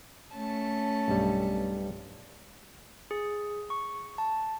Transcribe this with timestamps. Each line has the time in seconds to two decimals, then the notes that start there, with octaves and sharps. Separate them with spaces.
0.34 A3 C#4 A5
1.08 B1 G2 G3
3.11 G#4
3.70 C#6
4.18 A5